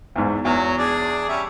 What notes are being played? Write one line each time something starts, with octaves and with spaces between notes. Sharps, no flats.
E2 G#2
E2 F#3
D4 G#4
G3 C#4 E5